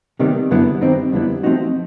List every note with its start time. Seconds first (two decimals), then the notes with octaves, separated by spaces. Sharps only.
0.19 C3 D#3 G3 B3
0.51 F#2 D3 G3 B3 E4
0.81 G2 D#3 G3 C4 D#4
1.12 F2 D3 G3 B3 E4
1.43 F3 A3 C4 D#4 F#4